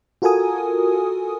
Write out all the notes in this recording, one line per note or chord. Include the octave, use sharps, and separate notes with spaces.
F4 F#4 A4 A#4 G#5 D#6